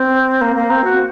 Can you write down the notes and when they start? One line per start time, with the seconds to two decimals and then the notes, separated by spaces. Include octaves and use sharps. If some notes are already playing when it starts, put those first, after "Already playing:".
Already playing: C4
0.41 A#3
0.56 A#3
0.70 C4
0.84 F#4